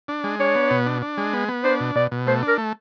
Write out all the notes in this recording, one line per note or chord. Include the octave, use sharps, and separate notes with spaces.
D4
G#3
D4 C#5
B3
B2
D4
D4
G#3
B3
B3
D4 C5
B2
B2 D5
B2
A3 C5
D4
A#4
A3